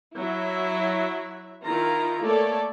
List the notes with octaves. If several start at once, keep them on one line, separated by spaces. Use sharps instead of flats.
F#3 E4 E5
D#3 E4 F4 A#5
A3 A#3 A4 C#5 D5